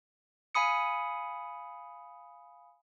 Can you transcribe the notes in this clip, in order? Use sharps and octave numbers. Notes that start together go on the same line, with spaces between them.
F5 G#5 B5 D#6 C#7